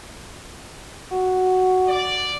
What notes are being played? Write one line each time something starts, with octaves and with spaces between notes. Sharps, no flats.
F#4
D5